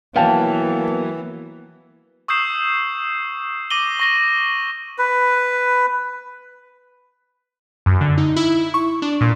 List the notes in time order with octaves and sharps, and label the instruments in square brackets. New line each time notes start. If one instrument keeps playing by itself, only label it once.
[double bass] E3 [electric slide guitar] F#3 B3 [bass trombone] A#3 [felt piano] F5 G5 A5
[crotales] C#6 D#6 E6 G6 C7 E7
D6 A#6 D#7 F#7 G7
C#6 A#6 G7
[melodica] B4
[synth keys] F#2
D3
D#4
E4
C#6
D4
A#2